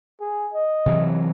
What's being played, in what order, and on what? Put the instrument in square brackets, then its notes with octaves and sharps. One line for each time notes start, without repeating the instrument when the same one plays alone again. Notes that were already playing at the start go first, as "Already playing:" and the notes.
[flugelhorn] G#4
D#5
[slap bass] C3 E3 F#3